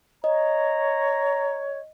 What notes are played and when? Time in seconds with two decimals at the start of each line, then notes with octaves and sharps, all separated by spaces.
0.24 C#5 D#5 A#5